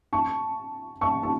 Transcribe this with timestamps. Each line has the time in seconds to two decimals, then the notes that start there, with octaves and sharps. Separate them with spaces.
0.13 A5 C#6
1.01 A5 C#6
1.23 A5